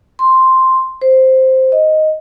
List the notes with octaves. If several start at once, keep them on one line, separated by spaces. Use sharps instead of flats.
C6
C5
D#5